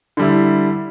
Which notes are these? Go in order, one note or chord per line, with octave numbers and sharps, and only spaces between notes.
D3 G3 E4